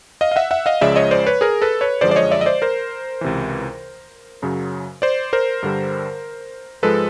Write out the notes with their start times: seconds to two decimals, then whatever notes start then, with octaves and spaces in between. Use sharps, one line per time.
0.21 D#5 F5
0.31 F5
0.36 E5 F#5
0.51 E5 F#5
0.66 D#5 F5
0.81 C#2 C#3 F3 G#3 D5 E5
0.96 C#5 D#5
1.11 C5 D5
1.26 B4 C#5
1.41 G#4 A#4
1.62 A4 B4
1.81 B4 C#5
2.01 F#2 D3 F3 G#3 C5 D5
2.11 D5
2.16 C#5 D#5
2.31 D5 E5
2.41 D#5
2.46 C5 D5
2.62 A#4 C5
3.21 C#2 C3 E3
4.42 F#2 C#3 F#3
5.02 C5 D5
5.33 A#4 C5
5.63 G2 D3 G3
6.82 G#2 F3 G#3 A4 B4